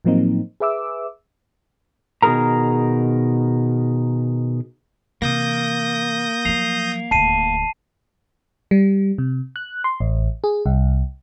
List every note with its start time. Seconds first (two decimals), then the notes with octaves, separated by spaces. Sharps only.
0.05 A2 F3 F#3 A#3 C4 D#4
0.60 G#4 B4 E5 D6 E6
2.22 B2 D#3 F#4 G#4 A#4 A#5
5.22 C3 E3 A#3 D#6 G6 A#6
6.45 F3 F#3 C7 F7
7.11 D#1 D2 A5 C7 D#7
8.71 G3
9.18 C3
9.56 F#6
9.84 C6
10.00 A1
10.44 G#4
10.66 C2